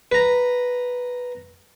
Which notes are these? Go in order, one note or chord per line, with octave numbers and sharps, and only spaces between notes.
B4 A#5